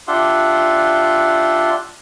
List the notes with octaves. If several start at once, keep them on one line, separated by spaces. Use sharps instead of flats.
D4 F4 G4 E5 F#5 C6